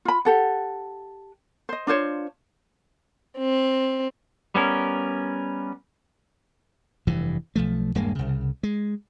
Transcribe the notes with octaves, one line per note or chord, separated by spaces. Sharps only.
F4 B5
G4 A4 F#5
C5 D#5
D4 F4 C5 C#5
C4
G3 B3 C#4 A#4
F1 G2 E3
B1 F3 A3
D#1 G2 G#3 A#3
C2 C#3
G#3